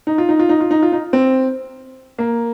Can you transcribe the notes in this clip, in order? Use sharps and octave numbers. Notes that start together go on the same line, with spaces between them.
D#4
F4
D#4
F4
D#4
F4
D#4
F4
D#4
C4
A#3